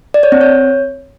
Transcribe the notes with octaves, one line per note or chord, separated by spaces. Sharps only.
D5
C#5
C4
C#5